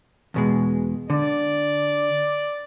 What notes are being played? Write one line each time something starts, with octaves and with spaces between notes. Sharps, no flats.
E2 B2 G#3
D3 D5